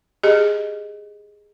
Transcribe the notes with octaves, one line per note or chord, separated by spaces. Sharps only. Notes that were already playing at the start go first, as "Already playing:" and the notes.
G4 G#4 D#5